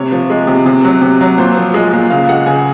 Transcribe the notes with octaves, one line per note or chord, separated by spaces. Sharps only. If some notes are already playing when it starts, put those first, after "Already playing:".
Already playing: C3 C#5
F3
G#3
C3
C3
F#3
C3
F#3
A#2 C5
F3
G#3 D#5
A#2
C#3 F5
G#3 F#5
C#3 G#5